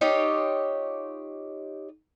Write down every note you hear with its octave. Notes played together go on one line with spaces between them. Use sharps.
D#4 F4 G4 C#5